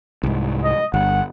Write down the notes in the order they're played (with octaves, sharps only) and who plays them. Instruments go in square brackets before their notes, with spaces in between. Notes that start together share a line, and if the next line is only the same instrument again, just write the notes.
[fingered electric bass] C2 G#2
[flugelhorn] D#5
[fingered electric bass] G1 [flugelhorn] F#5